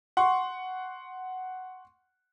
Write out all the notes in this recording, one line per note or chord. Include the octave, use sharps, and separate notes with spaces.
F#5 C6 C#6